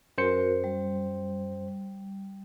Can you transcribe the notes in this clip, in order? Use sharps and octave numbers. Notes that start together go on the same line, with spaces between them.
F#2 F#4 A#4 C5 C#7
G3